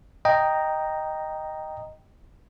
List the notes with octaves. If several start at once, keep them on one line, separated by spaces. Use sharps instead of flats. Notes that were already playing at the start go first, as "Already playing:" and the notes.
D#5 G5 A#5